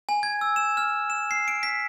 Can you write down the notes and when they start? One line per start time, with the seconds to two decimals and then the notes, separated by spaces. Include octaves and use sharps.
0.09 G#5
0.23 G#6
0.41 E6
0.56 E7
0.77 F6
1.10 E7
1.31 C7
1.48 D7
1.63 B6